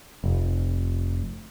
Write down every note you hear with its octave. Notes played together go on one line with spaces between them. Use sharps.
F1